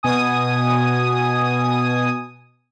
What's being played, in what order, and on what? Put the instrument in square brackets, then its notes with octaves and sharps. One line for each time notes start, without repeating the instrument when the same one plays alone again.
[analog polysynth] B2 G#5 D#6